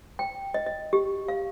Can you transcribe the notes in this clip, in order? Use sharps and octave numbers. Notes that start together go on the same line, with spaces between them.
G5
D#5
D#5
G4
F5